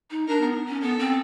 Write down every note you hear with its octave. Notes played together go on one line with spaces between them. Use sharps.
D#4
D4 A#4
B3
C#4
B3 A4
C4